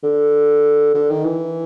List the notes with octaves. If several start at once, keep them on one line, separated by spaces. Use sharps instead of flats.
D3
D3
D#3
E3